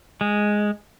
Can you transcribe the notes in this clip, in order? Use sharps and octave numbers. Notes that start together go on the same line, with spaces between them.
G#3